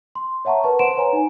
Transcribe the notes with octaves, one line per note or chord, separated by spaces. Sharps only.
C6
C#5 E5 F#5 A5 A#5 C#6
A#4 B4 A5 C#6
C5 F#5 C6 D7 E7
B4 C#5 G#5 A#5
D#4 G#5